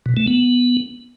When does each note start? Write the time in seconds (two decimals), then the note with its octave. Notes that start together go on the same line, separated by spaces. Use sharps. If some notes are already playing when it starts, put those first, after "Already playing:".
0.06 B2
0.17 A3
0.27 B3